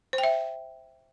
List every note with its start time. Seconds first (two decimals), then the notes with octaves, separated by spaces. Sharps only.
0.13 C5
0.18 G5
0.24 E5